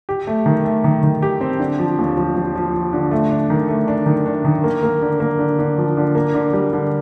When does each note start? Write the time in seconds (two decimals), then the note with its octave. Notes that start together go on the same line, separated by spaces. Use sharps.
0.09 G4
0.27 A3
0.46 D#3
0.65 A3
0.84 D#3
1.03 D#3
1.22 G4
1.41 C4
1.59 D3
1.79 F3
1.98 D#2
2.17 F3
2.36 F3
2.55 F3
2.74 F3
2.93 D3
3.11 A3
3.31 D4
3.50 D#3
3.68 A3
3.88 D4
4.06 D#3
4.26 D4
4.45 D#3
4.64 A#3
4.83 A#3
5.02 D3
5.20 A#3
5.39 D3
5.59 D3
5.78 F3
5.97 D3
6.15 A#3
6.34 D3
6.53 G3
6.73 D3